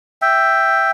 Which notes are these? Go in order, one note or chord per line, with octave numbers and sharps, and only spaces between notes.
E5 G5